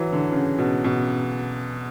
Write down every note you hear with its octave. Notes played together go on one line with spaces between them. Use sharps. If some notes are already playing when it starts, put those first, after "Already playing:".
Already playing: E3 F#3
D3
C#3
B2
B2